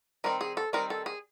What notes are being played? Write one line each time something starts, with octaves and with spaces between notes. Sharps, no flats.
D#3 G3 C4 D#4 A#4
G#4
A4
D#3 G3 C4 D#4 A#4
A4
G#4